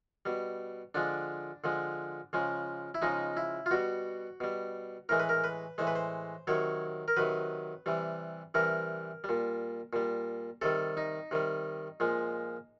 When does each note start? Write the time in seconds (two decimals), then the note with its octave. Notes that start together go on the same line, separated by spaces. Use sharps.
0.25 B2 G3
0.94 D3 F3 G#3 D4
1.64 D3 F3 G#3
2.33 C#3 F3 G#3
2.95 E4
3.02 C#3 F3 G#3 D#4
3.37 E4
3.66 F4
3.71 B2 G3 F#4
4.40 B2 G3
5.09 A2 E3 G#3 A#4
5.19 B4
5.29 A#4
5.44 B4
5.78 A2 E3 G#3 C5
5.87 B4
5.95 C5
6.47 C3 D#3 F#3 C#5
7.08 A#4
7.17 C3 D#3 F#3 B4
7.86 C3 E3 G3
8.54 C3 E3 G3 A#4
9.24 A#2 G3
9.93 A#2 G3
10.61 C3 D#3 G3 A4
10.97 D#4
11.31 C3 D#3 G3
12.00 A#2 F3 G#3